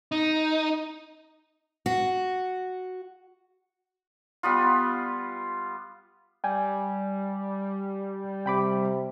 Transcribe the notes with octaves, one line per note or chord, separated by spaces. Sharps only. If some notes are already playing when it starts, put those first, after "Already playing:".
D#4
F#4
G3 B3 F4
G3 G5 G#5
C3 G5 B5 D6